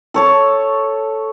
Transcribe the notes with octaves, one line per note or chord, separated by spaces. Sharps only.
A4 C#5 A5